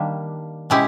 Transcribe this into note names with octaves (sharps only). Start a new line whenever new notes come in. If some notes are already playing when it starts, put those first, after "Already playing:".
Already playing: D#3 G3 A#3 D4
B2 G#3 C#4 E4 G4